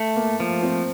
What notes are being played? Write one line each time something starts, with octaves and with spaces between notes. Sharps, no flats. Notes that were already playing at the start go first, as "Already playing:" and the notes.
Already playing: A3
A#3
F3 A#3
C4